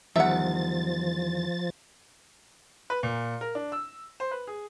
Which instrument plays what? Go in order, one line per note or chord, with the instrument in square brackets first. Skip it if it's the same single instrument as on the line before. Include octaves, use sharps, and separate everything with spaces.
[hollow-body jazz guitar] E2 D#3 G3 [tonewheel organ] F3 A6 [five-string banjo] E5 F#5
[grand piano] B4
A#2
A#4
D4
E6
C5
B4
G#4